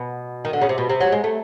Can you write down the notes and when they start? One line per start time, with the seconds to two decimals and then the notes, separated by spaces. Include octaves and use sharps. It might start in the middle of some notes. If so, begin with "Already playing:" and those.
Already playing: B2
0.45 D#3
0.53 D3
0.61 C#3
0.69 C3
0.78 B2
0.89 C3
1.01 F#3
1.12 G#3
1.24 A3